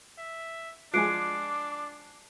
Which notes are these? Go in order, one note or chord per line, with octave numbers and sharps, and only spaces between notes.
E5
F3 G#3 D4 G#5 D6 F#6 C7 D7